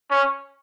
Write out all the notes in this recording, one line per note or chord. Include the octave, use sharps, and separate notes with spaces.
C#4